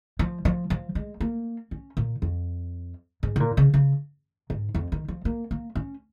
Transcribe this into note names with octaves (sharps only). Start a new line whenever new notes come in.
F3
F3
F3
G#3
A#3
C#4
A#2
F2
G#2
C#3
A#2
C#3
C#3
G#2
F2
D#3
F3
A#3
A#3
C#4